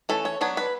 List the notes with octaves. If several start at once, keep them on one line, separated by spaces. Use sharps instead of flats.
E3 A3 C#4 A4
C#5
F#3 B3 D4 C#5
B4